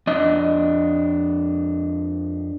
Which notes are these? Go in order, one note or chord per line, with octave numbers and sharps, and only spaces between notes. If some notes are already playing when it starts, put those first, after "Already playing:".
F2 D4 D#5